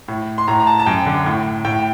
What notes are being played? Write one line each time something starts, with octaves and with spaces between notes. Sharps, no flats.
A2
C6
A2 A#5
A#5
A5
A5
F#2 G5
D3
A2
A2 G5